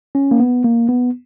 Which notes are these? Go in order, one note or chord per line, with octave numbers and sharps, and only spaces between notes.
C#4
A#3
B3
A#3
B3